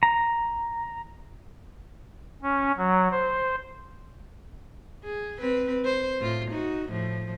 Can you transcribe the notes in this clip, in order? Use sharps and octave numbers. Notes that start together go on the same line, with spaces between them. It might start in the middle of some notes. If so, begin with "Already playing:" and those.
A#5
C#4
F#3
C5
G#4
C4 B4
C5
A2 F4
D#4 F#4
A2 F3